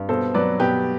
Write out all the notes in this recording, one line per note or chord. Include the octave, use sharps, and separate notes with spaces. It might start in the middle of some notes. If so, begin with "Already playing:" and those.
Already playing: G2
B2 A4 C5
F#3 B4 D5
B2 G4 B4